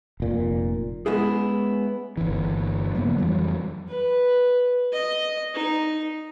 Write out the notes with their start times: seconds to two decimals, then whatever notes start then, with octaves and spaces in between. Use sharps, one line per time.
0.20 F1 A#2
1.06 G#3 B3 C#4 E4 G#4
2.17 G1 E3
2.95 C#3 F3 A#3 B3
3.18 F2 E3 F#3 G3
3.88 B4
4.93 D#5
5.54 D#4